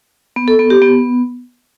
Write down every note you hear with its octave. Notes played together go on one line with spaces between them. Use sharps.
B3
A4
B3
G4
B3